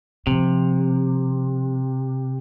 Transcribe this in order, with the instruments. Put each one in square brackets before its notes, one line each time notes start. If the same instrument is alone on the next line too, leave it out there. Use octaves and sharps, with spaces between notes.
[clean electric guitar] C3 [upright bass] F3 C4